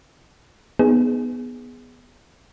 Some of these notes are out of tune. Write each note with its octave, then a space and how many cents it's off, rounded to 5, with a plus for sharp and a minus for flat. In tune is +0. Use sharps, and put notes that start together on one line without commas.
B3 +0 D#4 -15 G#4 +0